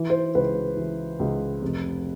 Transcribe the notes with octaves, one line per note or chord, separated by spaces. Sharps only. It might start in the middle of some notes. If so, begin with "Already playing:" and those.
Already playing: E3
C5
C#2 B4
E3
C#2
F1